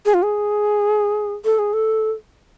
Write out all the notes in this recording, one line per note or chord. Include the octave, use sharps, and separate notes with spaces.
G#4
F4
G#4
A4
G#4
A4